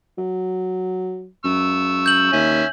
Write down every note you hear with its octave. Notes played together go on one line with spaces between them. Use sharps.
F#3
F#2 C#6 E6
G6 F#7
D#2 C#4 E5 G#5